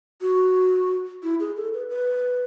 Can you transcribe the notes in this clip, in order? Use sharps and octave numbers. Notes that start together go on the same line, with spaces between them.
F#4
E4
G#4
A4
B4
B4